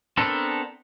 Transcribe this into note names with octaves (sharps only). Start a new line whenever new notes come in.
B3 C4 D4 A4 A#4